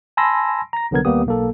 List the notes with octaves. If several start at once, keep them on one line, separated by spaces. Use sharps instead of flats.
G#5 A5 B5 C6 E6 A#6
A#5 A#6
C2 D3 F#3 B3 A#4 G#6
D#2 G3 A#3 B3 G4 D#6
B1 A#3 A4